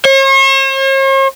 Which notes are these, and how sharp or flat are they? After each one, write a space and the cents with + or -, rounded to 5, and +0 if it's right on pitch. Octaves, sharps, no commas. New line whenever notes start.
C#5 -45